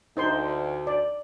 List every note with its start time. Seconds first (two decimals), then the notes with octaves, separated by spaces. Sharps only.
0.17 D2 D#4 C5 C6
0.87 D5